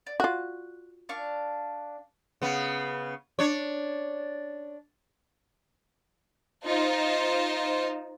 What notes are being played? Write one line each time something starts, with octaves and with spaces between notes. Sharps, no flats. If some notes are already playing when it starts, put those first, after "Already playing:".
D5
F4 F#4 F#6
D4 F5 C#6
C#3 B3
D4 C#5
D#4 F4 C5